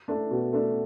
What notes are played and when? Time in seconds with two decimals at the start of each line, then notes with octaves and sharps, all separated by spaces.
0.08 A3 D4
0.31 B2
0.53 A3 D4